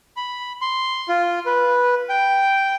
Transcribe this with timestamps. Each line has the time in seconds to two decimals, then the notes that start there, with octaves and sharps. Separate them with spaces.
0.17 B5
0.61 C6
1.08 F4
1.46 B4
2.09 G5